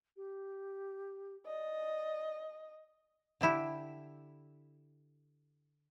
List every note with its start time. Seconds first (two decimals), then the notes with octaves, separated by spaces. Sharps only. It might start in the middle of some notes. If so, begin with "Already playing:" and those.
0.17 G4
1.46 D5 D#5
3.41 D3 D4 E4 G4